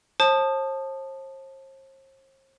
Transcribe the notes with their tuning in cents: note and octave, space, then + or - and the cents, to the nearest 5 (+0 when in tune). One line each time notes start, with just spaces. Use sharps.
C5 +40 A5 +0 D#6 -20